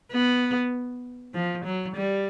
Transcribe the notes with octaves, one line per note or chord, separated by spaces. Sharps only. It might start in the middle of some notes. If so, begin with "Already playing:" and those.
B3
F3
F#3
G3